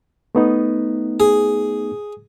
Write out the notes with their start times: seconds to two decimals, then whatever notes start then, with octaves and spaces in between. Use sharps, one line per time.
0.35 A3 B3 D#4
1.20 G#4